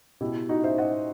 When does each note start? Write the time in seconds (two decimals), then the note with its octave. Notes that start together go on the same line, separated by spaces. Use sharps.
0.21 B2 E4 G4
0.49 D#4 F#4
0.64 C5 E5
0.78 D#5 F#5